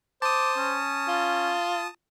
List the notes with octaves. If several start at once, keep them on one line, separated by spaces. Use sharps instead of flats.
C5 A5 D6 D#6
C#4
F4